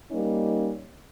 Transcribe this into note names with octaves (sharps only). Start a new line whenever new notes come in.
G3 A#3 C#4 D#4